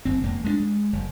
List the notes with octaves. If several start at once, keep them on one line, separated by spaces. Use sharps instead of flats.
F#1 C4
E1 A#3
G#3 B3 D4
G#3
F#1